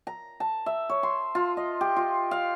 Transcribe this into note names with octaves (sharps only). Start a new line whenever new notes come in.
A#5
A5
E5
C#5
C6
F4
D#5
G4
F4
F5